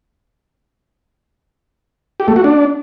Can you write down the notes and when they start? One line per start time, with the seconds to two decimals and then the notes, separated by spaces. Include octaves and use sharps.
2.20 G4
2.28 A3
2.36 F#4
2.44 D4